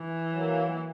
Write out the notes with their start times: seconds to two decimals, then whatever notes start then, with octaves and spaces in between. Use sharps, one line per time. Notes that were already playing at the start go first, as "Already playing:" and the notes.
Already playing: E3
0.33 F#3 A#3